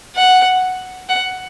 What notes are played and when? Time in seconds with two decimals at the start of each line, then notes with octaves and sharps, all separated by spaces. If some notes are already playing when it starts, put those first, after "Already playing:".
0.16 F#5
1.09 F#5